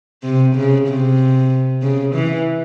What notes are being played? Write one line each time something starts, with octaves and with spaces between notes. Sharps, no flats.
C3
C#3
C3
C#3
E3